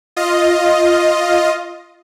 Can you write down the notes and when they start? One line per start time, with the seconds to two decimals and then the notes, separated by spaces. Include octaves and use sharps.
0.16 F4 D#5